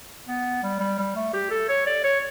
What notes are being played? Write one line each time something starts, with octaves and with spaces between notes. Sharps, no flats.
B3
G3
G3
G3
A3
G4
A4
C#5
D5
C#5